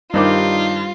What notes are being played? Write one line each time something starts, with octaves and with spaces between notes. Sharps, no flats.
G2 D#3 G3 D#4 F4 C5 D6